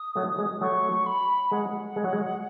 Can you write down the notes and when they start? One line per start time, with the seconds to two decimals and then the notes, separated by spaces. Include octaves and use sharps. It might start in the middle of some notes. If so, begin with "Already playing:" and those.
Already playing: D#6
0.15 F#3 A3
0.38 G#3
0.61 F#3 A3 C#6
1.06 B5
1.51 G#3 F#5
1.96 G#3
2.04 F#3
2.13 G#3